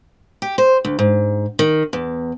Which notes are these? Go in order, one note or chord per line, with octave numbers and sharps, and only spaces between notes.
G4
C5
D2
G#2
D#3
E2